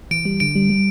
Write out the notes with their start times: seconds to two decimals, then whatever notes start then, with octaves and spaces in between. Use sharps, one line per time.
0.11 E3 D7
0.25 G3
0.40 D3 D7
0.55 G3
0.70 G3